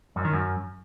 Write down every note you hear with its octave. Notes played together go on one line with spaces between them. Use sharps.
F#2
D#3
F#2